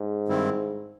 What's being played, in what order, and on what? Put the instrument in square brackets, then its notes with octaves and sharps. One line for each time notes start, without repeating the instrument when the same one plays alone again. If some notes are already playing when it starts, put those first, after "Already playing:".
Already playing: [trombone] G#2
[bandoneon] G2 D#3 G3 C4 E4